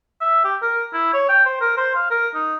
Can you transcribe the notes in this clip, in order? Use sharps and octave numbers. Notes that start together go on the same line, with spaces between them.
E5
G4
A#4
E4
C#5
G5
C5
A#4
C5
F5
A#4
D#4